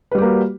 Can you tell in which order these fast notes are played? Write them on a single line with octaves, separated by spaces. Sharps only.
B4 G3 G4 A#3 F#4